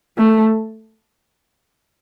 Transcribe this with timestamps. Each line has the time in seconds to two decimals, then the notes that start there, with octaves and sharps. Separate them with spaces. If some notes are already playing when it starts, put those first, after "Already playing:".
0.18 A3